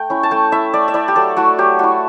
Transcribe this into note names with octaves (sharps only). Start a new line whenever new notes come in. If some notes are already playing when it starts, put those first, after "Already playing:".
Already playing: A3 G5
C#4 E4
A5
A3 G5
E4 E5
A3 D5
E5
E4 D5
G4
F#3 A4
A3 E4 F#4
F#3 G4
A3 E4 F#4